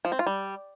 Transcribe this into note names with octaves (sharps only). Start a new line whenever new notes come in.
F3
C4
F4
G3